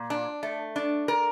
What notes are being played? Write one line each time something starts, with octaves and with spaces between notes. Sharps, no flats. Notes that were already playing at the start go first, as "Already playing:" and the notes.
Already playing: A#2
D4
A3
D4
A#4